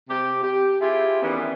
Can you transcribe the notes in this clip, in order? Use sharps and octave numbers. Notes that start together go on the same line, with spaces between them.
C3 G4
G4
C4 E4 F4 G4 G#4
D#3 E3 G3 B3 C#4